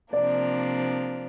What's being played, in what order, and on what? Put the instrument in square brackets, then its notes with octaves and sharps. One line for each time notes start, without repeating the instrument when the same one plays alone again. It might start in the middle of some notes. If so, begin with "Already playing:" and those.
[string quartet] C3 F3 A#3 D4 [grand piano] D5